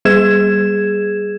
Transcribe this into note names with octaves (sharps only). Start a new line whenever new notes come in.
G3 G#4 G#6 E7